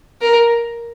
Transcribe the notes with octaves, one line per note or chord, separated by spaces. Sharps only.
A#4